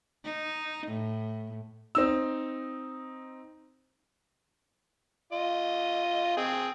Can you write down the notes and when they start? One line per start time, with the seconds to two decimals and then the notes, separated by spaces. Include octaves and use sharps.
0.24 D#4
0.87 A2
1.95 C4 D#4 E6
5.32 F4 D#5
6.37 C4 G#4